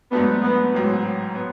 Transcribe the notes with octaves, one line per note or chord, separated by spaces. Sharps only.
G#2 F#3 A3 B3 D4
B3
A1 G#2 F#3
B3